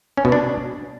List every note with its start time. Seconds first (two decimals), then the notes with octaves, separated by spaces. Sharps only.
0.17 C#4
0.25 B2
0.32 D4